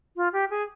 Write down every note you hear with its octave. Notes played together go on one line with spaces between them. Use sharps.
F4
G4
G#4